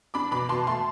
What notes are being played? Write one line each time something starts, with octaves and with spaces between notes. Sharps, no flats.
D4 B5 D6
B2 B5 D6
B2 A5 C6
A3 A5 C6